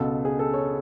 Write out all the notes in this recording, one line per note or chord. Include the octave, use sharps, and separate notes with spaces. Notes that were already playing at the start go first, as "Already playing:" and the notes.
Already playing: C#2 B2 A4
G#4
A4
C#5